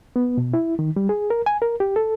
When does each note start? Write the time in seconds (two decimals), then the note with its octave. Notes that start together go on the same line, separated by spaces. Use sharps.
0.16 B3
0.38 B2
0.54 E4
0.79 D#3
0.96 G3
1.09 G#4
1.30 A#4
1.46 G#5
1.62 A#4
1.80 G4
1.96 A4